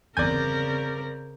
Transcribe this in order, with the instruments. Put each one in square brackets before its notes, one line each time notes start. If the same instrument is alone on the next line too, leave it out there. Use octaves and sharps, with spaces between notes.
[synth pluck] G1 E2 G#5 [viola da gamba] C#3 C4 A#4 [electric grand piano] D5 G6